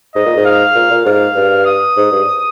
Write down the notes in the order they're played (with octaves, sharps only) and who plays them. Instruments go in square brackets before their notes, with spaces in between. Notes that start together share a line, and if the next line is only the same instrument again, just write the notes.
[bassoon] G#2 [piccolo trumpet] D#5
[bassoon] A#2
G#2
[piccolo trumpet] F5
[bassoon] A#2
A#2
[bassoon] G#2 [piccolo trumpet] F5
[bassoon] G2
[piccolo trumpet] D#6
[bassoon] G#2
G2